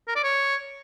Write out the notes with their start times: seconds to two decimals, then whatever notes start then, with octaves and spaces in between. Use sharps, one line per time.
0.08 A#4
0.16 D5
0.24 C#5